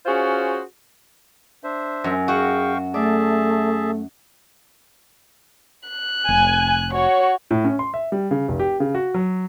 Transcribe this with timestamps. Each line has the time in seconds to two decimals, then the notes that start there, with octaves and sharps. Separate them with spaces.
0.06 C#4 F4 F#4 G#4 C5
1.64 D4 C5 E5
2.04 F#2
2.28 F#4 G#4 F5 G5 C#6
2.94 A3 G#4 D5 E5 A5
5.89 F#6
6.29 F1 G#5
6.93 F#4 C#5
7.51 A2
7.65 C#4
7.79 C6
7.94 E5
8.12 G3
8.31 C#3
8.48 F1
8.60 G4
8.80 C#3
8.95 F#4
9.14 F#3